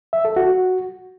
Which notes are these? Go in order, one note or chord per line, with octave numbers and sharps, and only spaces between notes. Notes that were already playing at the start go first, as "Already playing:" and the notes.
E5
A4
F#4